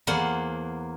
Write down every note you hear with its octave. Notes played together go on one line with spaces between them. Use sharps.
E2 A#3 C5 F#5 C6